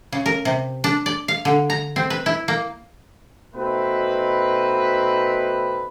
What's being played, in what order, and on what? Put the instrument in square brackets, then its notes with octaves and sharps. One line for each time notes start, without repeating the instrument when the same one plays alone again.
[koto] C#3
A#4
C3
D4
D5
F5
D3
A#5
C4
B4
E4
A#3
[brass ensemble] B2 A3 C4 D#4 B4